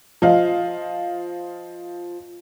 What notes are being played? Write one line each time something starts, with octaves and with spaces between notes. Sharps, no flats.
F3 D#5 F5